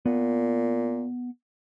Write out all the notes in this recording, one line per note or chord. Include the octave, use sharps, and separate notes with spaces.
A#2 B3